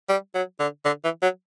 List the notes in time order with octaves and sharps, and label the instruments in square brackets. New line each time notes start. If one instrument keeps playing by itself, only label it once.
[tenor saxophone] G3
F#3
D3
D3
E3
F#3